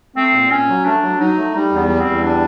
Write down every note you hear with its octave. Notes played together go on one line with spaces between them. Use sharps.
A3 C4
A#2
A#2 C#4
F#3
A3 D4
F#3
F#3 D#4
A3
G3 D#4
E2
B3
G3
C4
E2
G3 D4